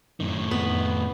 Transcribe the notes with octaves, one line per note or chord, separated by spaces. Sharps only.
F#2 A2 D#3
F2 B3